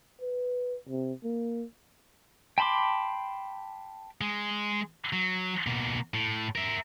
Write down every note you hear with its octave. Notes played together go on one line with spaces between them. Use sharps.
B4
C3
A#3
G5 A5 B5 C6 D6
G#3
F#3
B2 A#3
A2
A#4 E5